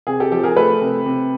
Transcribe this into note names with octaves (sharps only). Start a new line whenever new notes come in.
C3 G#4
G4 A4
F3 G4 A4
G#4 A#4
A3 A4 B4
C3
C3